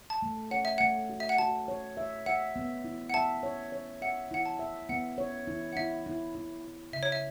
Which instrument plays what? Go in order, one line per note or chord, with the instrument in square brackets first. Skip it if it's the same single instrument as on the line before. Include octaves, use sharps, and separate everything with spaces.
[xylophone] A5
[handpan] A3
[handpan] C#5 [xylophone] F#5
[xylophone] E5
[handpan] A3 [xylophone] F#5
[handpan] F#4
[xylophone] E5
F#5
[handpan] F#4 [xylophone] A5
[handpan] C#5
E5
[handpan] E5 [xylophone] F#5
[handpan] B3
E4
[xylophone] F#5
[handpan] E5 [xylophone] A5
[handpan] C#5
C#5
[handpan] E5 [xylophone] F#5
[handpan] E4 [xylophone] F#5
[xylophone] A5
[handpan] E5
[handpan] B3 [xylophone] F#5
[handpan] C#5
E4
[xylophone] F#5
[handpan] E4 [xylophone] E5
[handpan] E4
E4
E4
[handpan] C#3 [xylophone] E5
[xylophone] C#5
E5